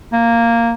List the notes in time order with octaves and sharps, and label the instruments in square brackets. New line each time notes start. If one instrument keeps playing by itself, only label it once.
[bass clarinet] A#3